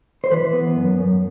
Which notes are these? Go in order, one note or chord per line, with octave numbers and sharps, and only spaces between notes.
C5
E3 B4
B3
F#2
F#2